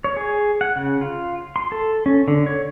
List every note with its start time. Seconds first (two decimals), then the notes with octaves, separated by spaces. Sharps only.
0.04 C#5
0.17 G#4
0.61 F#5
0.76 C#3
1.01 F4
1.56 C6
1.72 A4
2.06 C#4
2.28 D3
2.46 C#5